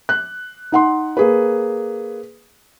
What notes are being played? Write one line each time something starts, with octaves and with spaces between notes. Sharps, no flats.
F#6
D#4 F#5 C6
A#3 G#4 B4